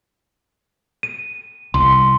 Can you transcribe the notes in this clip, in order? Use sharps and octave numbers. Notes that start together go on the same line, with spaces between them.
D#7
C2 C6